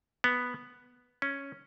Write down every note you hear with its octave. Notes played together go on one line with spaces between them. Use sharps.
B3
C#4